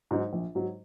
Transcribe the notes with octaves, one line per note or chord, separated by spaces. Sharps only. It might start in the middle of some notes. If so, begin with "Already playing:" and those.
G#2 F#3 D#4
A#1
G#2 F#3 D#4